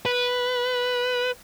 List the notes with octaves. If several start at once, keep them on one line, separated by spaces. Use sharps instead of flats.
B4